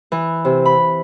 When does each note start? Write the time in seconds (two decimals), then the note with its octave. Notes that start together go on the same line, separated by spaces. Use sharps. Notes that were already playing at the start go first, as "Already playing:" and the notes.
0.12 E3
0.45 C3
0.65 B5